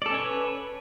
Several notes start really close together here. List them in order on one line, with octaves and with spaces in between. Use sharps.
D5 A4 C#4 C#5 B4